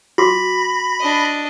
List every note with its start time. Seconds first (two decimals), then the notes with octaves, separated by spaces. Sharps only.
0.18 F#4 B5 D6 A#6 B6
1.00 D4 D#5